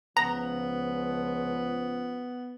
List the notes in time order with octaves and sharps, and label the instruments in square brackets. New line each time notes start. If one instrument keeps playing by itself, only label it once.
[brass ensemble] C#2 F3 [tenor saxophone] B3 [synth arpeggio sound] A#5